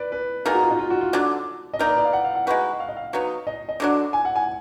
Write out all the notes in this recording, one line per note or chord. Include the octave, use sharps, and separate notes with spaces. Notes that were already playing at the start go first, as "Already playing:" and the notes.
Already playing: B4 D5
B4
B2 A#3 D#4 G#4 A#4
F#4
F4
D#4
F4
F#4
F4
D3 F#3 D4
D#5
A#3 D#4 A#4 D5
B4
D5
F5
F#5
F5
F#5
G#3 D#4 F#4 B4 F#5
F5
D#5
F5
F#3 B3 D#4
D#5
D#5
D3 F#3 D4
G#5
F#5
G#5